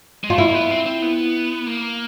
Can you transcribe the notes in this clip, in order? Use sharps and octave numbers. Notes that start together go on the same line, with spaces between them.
G#3
A3 F4
A#3 E4
A#3
B3
C4
C4
B3
A#3